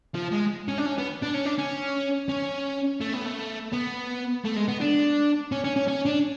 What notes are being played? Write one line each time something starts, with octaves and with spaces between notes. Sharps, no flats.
F3
G#3
C#4
D4
C#4
B3
D4
C#4
D4
C#4
C#4
A3
B3
A3
B3
A3
G#3
B3
D4
C#4
C#4
C#4
C#4
D4